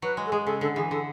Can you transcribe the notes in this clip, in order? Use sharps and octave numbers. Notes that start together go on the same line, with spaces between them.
F#3 B4
G#3
A4
G#3 G#4
C#3 A4
D3 A4
E3 G#4
D3 A4